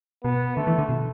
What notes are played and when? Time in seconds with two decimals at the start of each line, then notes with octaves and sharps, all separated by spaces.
0.24 B2 B3
0.56 D3 A3
0.67 E3
0.79 D3
0.89 B2